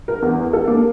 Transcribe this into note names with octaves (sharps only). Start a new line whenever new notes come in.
A#4
E2
A4
A#3